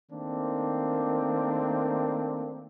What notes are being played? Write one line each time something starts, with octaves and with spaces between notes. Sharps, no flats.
D#3 A3 A#3 C4 D4